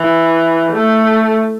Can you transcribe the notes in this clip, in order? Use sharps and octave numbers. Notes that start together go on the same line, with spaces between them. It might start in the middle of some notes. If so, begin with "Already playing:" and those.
Already playing: E3
A3